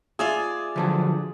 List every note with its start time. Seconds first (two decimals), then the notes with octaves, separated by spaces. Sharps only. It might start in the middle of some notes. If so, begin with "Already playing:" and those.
0.19 F4 G#4 D5 E5
0.76 D3 F3 F#3